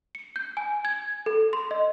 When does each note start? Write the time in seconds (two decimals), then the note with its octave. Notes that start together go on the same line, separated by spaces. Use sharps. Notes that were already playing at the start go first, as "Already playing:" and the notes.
0.15 C#7
0.36 G6
0.57 G#5
0.85 G#6
1.26 A4
1.53 C6
1.71 D#5